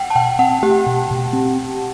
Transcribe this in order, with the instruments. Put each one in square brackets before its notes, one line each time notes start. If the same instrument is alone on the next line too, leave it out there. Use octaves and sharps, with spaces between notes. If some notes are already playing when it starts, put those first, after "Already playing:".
Already playing: [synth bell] F#5 G5
A5
[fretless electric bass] B2 [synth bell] G5
[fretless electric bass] C4 [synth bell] F#5
[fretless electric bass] A3 [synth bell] G4
[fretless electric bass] B2
B2
C4